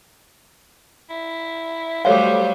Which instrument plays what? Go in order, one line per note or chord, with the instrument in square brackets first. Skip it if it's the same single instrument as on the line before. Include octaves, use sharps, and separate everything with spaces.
[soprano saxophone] E4
[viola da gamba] F#3 G3 A3 [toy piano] A4 C#5 F5 [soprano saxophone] C5